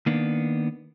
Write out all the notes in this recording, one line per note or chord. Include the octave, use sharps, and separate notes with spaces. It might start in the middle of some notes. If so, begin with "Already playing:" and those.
D#3 A#3 B3 D4